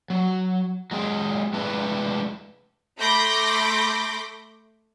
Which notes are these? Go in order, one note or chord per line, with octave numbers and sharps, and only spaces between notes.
F#3
F#3 G#3 G#4 G5
G#3 A3 D4 E4 B4
A3 B5 C6 D6 G6 A#6